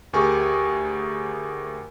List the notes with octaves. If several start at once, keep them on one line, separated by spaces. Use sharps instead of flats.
D2 G4 G#4 A#4 G#5 C#6